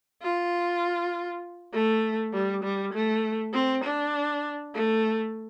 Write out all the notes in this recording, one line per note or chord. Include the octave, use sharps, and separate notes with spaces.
F4
A3
G3
G3
A3
C4
D4
A3